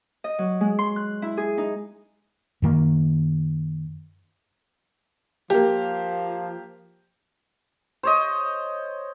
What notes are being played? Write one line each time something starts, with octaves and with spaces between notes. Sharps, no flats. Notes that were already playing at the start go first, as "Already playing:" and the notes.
D#5
F#3
G#3
C6
F#6
E4
G#4
D#4
F#2 D#3 A#3
F3 A#3 G4
C5 C#5 D#5